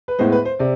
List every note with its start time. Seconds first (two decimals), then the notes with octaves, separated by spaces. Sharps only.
0.08 B4
0.19 A2 G#3 B3 C5
0.32 B4
0.45 C5
0.59 C3 D5